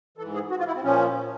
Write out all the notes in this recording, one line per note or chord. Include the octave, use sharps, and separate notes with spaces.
G#2 E3 A4
G#4
F#4
F4
E4
C4
A#2 F3 C#4